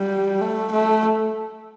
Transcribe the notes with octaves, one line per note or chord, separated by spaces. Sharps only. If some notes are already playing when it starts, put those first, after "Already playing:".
Already playing: G3
A3
A3